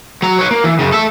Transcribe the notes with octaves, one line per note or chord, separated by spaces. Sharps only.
F#3 A#5
B4 C#5
A#3
E3
F#2 C#3
A4 E5